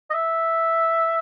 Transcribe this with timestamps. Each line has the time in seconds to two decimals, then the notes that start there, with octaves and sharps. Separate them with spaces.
0.10 D#5
0.14 E5